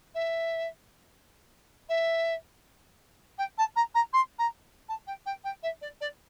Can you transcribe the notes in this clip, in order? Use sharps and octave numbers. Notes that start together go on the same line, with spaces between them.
E5
E5
G5
A5
A#5
A#5
C6
A#5
A5
G5
G5
G5
E5
D5
D5